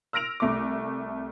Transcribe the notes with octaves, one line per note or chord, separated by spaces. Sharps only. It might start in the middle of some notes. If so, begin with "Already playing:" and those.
E6 F6 A#6 D7 F7
C2 A3 D6